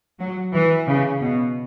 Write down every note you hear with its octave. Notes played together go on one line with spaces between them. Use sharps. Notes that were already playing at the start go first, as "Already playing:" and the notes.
F#3
E3
C#3
B2